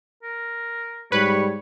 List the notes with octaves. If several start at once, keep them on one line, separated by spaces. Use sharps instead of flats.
A#4
G#2 G3 B4 C#5